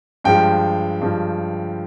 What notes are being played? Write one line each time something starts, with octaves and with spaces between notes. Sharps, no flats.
G2 F3 G#3 G5
G2 F3 G#3